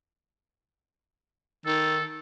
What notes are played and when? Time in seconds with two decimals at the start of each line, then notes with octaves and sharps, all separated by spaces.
1.66 D#3 A4